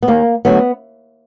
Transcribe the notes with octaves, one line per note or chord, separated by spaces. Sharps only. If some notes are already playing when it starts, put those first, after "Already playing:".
B3
D#2 A#3
D3 F#3 A3 B3